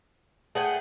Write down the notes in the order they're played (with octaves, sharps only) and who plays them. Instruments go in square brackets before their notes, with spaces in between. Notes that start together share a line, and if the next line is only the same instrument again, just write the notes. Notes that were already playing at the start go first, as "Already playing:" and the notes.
[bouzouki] A3 F#5 G5 [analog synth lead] G#4